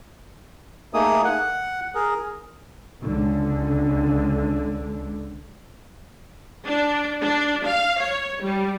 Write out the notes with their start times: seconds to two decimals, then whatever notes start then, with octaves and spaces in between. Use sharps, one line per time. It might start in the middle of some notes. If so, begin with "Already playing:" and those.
0.94 A3 A#3 D#4 G#4 D#6
1.25 F#5
1.95 G#4 A#4
3.02 C#2 D3
6.66 D4
7.21 D4
7.67 F5
8.02 C#5
8.42 G3